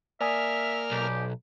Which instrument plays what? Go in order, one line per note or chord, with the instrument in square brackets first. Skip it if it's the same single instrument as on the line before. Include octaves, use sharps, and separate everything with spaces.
[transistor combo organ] A#3 F6 [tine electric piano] D5 G#5 D#6 [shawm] E5
[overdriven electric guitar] B1 [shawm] G4